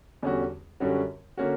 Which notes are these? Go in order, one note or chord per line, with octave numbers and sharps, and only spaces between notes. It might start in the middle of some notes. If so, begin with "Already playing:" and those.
E2 D3 G3 C#4 F#4
F#2 D3 G3 C#4 F#4
D3 A#3 C#4 F#4